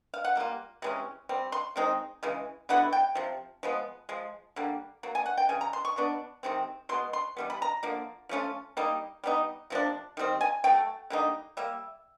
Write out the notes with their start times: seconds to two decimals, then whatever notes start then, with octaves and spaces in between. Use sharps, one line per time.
0.14 F5
0.24 F#5
0.36 G3 A#3 F4
0.82 C3 E3 G#3 C#4
1.29 G3 C4
1.52 C6
1.76 D#3 G#3 C4 D#4
2.23 C#3 E3 G#3
2.69 D3 F#3 B3 E4 F#5
2.93 G5
3.15 C3 F3
3.63 F3 G#3 B3
4.09 F3 G#3
4.56 D3 G3 A#3
5.03 F#3 A#3
5.15 G#5
5.26 F#5
5.38 G5
5.49 C#3 E3 G#5
5.61 A#5
5.73 C6
5.85 C#6
5.96 B2 F#3 B3 D4
6.43 C3 D#3 G#3 C4
6.89 B2 C6
6.92 G#3 B3
7.13 C6
7.37 E3 G3 B3
7.50 B5
7.62 A#5
7.83 D3 F3 A#3
8.29 F3 A3 C#4 F4
8.77 G3 A#3 D#4
9.24 G3 B3 D#4
9.70 C3 F3 A#3 D4
10.17 D#3 G3 C4
10.41 G#5
10.64 F#3 A3 G5
11.10 D3 G3 A#3 D#4
11.57 G3 A#3 E5